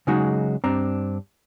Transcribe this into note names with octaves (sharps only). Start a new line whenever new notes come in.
C#3 F#3 G#3 D#4 F#4
G2 C4 D4 A#5